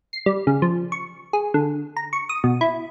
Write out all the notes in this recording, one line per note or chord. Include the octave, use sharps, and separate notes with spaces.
C7
G3
C#3
F3
C#6
G#4
D3
A#5
C#6
D#6
B2
E4